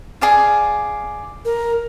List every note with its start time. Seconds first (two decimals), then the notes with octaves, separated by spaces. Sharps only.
0.21 G#4 D5 F5
1.45 A#4